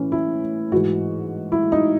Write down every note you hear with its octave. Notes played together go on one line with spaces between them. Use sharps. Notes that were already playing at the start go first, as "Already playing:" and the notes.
Already playing: A2 E3 C#4
E4
G#2 E3 F#4
E4
D#4